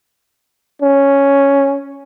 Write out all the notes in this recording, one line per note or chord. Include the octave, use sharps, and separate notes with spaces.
C#4